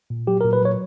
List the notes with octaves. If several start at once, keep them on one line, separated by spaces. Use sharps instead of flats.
A#2
F#3 G4
A#2 A#4
B4
F#3 C#5